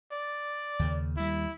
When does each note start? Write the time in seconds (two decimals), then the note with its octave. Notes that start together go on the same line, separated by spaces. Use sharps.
0.12 D5
0.79 D#2 C#3
1.17 D#2 G3 E4